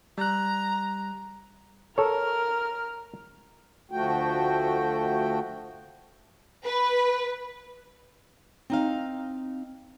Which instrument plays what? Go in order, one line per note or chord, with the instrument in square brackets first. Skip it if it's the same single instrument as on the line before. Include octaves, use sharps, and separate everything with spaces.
[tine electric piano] G3 F#6 [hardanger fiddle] A#5
[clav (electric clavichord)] A4 C#5 [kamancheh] A#4 F6
[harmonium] D2 F3 A3 F#4 G5
[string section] B4
[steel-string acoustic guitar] C4 D#4 F5